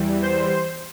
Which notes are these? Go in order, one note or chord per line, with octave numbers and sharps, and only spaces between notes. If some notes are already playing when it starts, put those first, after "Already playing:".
Already playing: E2 E3 G3
C5